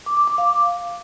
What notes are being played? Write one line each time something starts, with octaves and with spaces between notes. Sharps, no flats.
D6
D6
D6
F5